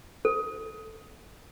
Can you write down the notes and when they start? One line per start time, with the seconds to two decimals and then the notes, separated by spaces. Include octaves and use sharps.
0.25 A4